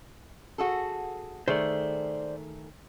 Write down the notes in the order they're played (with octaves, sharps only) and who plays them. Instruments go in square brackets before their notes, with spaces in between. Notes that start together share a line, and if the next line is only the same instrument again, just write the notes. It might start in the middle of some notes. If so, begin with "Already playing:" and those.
[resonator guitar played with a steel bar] F#4 G#4 A4
[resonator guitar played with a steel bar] D#3 A3 G#4 [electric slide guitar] C5 D5